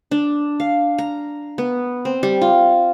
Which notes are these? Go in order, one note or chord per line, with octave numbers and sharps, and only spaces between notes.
D4
F5
A#5
B3
C4
G3
F4